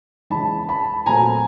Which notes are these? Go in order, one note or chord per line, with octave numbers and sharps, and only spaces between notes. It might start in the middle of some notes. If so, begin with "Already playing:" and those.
C#3 E3 G#3 A5 B5
A5 B5
A#2 F#3 A3 C4 G#5 A#5